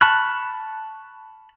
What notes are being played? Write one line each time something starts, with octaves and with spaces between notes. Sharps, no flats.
A5 B5 C#6 F6 F#6